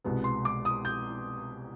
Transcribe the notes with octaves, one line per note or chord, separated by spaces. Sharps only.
C2 B2 G#3 B3
C6
D6
D#6
G6